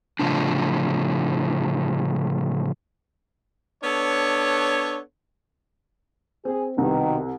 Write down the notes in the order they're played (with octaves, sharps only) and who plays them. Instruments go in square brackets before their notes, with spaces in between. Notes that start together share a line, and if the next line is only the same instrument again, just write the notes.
[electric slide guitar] A2 C#3 F3 D4
[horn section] B3 D4 A4 C#5
[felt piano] C4 [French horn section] G#4
[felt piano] C2 [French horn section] B2 D#3